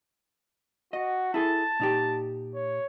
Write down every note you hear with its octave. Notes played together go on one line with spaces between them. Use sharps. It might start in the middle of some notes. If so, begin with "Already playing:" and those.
F#4 D#5
E4 G#4 A4 A5
A#2 D#4 G4
C#5